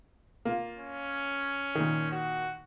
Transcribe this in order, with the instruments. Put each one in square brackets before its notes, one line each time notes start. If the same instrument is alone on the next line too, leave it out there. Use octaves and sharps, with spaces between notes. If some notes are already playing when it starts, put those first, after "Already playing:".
[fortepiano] A#3 F4
[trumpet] C#4
[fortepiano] A#2 D#3
[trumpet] F#4